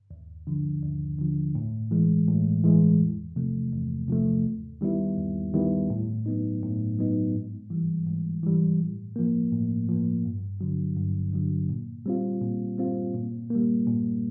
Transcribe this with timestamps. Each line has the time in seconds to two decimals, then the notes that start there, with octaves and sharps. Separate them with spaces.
0.11 D#2
0.47 D3 F3
0.82 D#2
1.19 D3 F3
1.55 A2
1.91 E3 G#3
2.28 A2
2.64 E3 G#3
3.00 E2
3.36 C3 F3 A3
3.72 E2
4.08 C3 F3 A3
4.46 D#2
4.81 D#3 G3 B3 E4
5.18 D#2
5.54 D#3 G3 B3 E4
5.90 A2
6.26 F#3 B3 D#4
6.62 A2
6.99 F#3 B3 D#4
7.34 G#2
7.70 E3 G3
8.07 G#2
8.43 E3 G3
8.79 A2
9.16 F3 A#3
9.52 A2
9.89 F3 A#3
10.25 G2
10.61 D3 F#3
10.97 G2
11.33 D3 F#3
11.69 A#2
12.06 G3 C4 F4
12.42 A#2
12.78 G3 C4 F4
13.14 A#2
13.50 G3 A#3
13.87 A#2